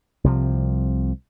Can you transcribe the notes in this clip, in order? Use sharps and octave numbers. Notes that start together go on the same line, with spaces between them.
C2 C3 F3